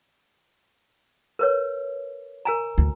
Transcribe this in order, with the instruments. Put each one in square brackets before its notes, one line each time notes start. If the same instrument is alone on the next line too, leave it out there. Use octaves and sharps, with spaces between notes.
[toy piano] A#4 B4 C#5
A#4 G#5 A#5
[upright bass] D2